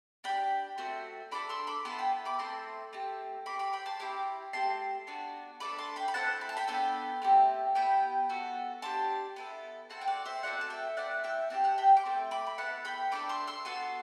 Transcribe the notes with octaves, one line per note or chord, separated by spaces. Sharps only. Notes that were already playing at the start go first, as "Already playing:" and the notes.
D4 G4 G5 B5
A3 C4 F#4
D4 A4 B5 D6
C6 E6
B5 D6
B3 E4 A4 A5 C6
G5 B5
B5 D6
A3 C4 E4 A5 C6
A3 C4 G4
C4 G4 B5 D6
B5 D6
G5 B5
A5 C6
C4 E4 G4 B5 D6
A3 C4 G4 A5 C6
B3 D4 F#4
A3 D4 A4 B5 D6
A5 C6
G5 B5
B5
C4 E4 A4 F#5 A5
B5
A5
G5 B5
B3 D4 A4 G5 B5
A3 C4 G4
B3 E4 G4 G5 B5
B3 F#4 A4
D4 G4 A5 C6
B3 E4 A4
C4 F#4 A4 F#5 A5
G5
D5 F#5
C5 E5
A3 C4 F#4 A4 D5 F#5
A5
E5 G5
A3 C4 E4 D5 F#5
E5 G5
C4 E4 G4 F#5 A5
F#5 A5
G5 B5
D6
A3 C4
B5 D6
B5
B3 E4 A4 F#5 A5
G5 B5
A3 D4 A4 B5 D6
C6 E6
C6 E6
B3 F#4 A4 A5 C6